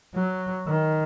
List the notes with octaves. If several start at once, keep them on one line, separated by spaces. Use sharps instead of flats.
F#3
D#3